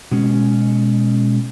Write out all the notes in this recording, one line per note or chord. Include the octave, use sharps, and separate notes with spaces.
B2 G#3 C#4